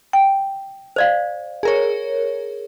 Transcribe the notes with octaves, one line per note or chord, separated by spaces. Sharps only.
G5
C5 D5 F5
G#4 A#4 C#5